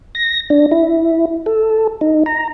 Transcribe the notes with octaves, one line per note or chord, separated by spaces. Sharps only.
A#6
D4
E4
A4
D#4
A#5